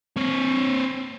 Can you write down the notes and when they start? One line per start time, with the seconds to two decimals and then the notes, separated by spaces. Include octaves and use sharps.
0.17 C4 C#5